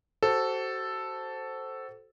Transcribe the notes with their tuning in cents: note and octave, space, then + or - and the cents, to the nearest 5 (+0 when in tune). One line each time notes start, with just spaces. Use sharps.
F#4 +35 A4 +0 C5 +0